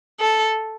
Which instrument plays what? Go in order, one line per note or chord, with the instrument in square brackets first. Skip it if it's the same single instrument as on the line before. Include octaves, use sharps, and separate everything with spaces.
[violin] A4